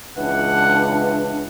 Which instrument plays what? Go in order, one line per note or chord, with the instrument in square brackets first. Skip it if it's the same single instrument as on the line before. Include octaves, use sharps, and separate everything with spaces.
[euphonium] C#2 [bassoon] E3 [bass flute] D4 [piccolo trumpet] F#5